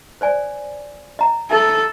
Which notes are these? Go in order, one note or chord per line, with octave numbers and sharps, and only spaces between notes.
C5 D5 G#5
D#5 A#5
A4 E5